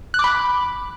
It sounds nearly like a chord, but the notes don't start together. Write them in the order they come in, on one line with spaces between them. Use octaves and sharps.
F#6 D6 B5